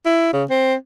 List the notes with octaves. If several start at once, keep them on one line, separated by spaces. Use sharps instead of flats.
E4
C#3
C4